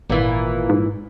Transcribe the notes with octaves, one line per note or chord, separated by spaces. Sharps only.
G#1 A#2 E3
G#2